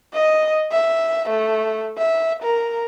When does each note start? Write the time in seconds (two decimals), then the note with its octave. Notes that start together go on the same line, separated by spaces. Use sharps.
0.14 D#5
0.72 E5
1.30 A3
1.98 E5
2.43 A#4